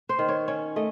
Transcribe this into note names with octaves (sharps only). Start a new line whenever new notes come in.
C5
D#3
C#5
C#4 C#5
A3 D#5